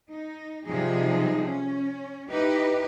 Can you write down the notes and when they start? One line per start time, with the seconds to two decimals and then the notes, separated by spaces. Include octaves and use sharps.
0.10 D#4
0.66 C3 F3 G3 D#4 G#4
1.47 C#4
2.29 D#4 E4 G4 B4